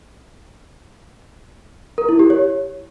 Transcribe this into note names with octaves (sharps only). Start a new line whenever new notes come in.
A#4
E4
G4
C#5